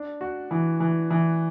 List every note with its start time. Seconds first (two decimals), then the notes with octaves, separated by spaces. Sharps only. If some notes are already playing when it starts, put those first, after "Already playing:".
Already playing: D4
0.21 F#4
0.51 E3
0.80 E3
1.11 E3